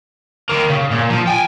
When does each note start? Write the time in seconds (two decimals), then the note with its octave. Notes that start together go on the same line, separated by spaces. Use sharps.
0.49 D#3 A#3
0.69 C#3
0.91 A#2
1.10 F3
1.27 G5 G#5